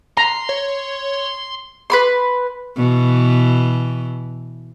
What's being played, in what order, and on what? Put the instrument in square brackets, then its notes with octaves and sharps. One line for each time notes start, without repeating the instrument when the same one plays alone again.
[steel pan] A#5 [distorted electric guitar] C6
[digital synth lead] C#5
[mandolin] B4 B5 C6
[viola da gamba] B2 E3